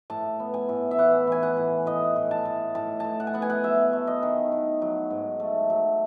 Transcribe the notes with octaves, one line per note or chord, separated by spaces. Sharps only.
A2 A5
B3
G#5
A2
E5
E3 F#5
E3 G#5
F#5
A2
A2 D#5
A2
A5
A2
A2 A5
A2 A5
F#5
G#5
B3 F#5
G#5
F#5
F#3 E5
A3
D#5
D#3
D#3
F#3
G#2
A3
F#3